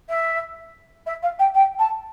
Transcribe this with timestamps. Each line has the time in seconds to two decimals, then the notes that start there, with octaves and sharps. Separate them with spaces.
0.09 E5
1.06 E5
1.23 F5
1.39 G5
1.55 G5
1.79 A5